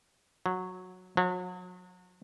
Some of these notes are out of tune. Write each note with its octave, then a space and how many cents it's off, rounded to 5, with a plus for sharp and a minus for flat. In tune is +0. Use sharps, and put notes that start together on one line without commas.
F#3 -10
F#3 -35